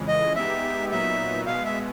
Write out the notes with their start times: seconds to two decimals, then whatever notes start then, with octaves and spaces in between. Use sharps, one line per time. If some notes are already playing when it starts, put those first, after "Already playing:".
Already playing: F2 C#3 E3 G#3
0.08 D#5
0.36 G#3 B3 D#4 G4 E5
0.91 A#2 F#3 B3 D#4 E5
1.46 B2 G#3 B3 F5
1.65 E5